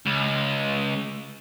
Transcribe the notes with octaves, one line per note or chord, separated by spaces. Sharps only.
C#2